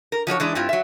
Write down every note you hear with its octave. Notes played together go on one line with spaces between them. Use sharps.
A#4
F3 F#3 D4 C#5
E3 G#3 D4
G2 C4 E4 F4
F#3 E5